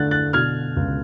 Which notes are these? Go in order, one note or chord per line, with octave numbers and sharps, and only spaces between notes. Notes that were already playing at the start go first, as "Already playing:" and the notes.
Already playing: D3 A3 F#6 A6
F#6 A6
B2 F6 G#6
C#2